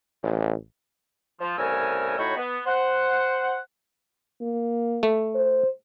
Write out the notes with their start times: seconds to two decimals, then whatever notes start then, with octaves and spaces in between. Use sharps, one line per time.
0.23 A1
1.41 F3
1.57 C2 A2 C#3 A#4 G#5 E6
2.18 A2 D#4 F#4 C#5 G5 B5
2.37 B3
2.67 C5 F#5
4.41 A#3
5.03 A3
5.35 C5